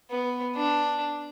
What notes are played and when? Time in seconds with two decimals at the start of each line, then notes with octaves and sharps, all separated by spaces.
0.11 B3
0.56 D4